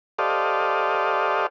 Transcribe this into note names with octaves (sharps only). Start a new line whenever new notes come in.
G4 A4 C5 D5 D#5 F5